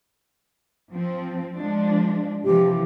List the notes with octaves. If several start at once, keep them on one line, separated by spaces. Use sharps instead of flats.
F3 C4
F3 G#3 D4
C3 E3 F3 G4